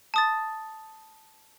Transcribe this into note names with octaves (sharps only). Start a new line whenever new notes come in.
A5 D#6 A6